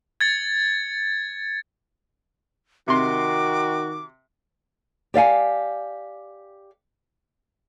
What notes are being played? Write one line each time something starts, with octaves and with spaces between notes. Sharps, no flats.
G#6 A6 C#7
C3 D#3 F#4 C6 D6
G4 D5 F5 G#5